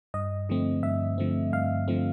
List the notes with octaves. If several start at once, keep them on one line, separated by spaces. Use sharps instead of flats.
G2 D#5
D3 F3 A3 C4
G2 E5
D3 F3 A3 C4
G2 F5
D3 F3 A3 C4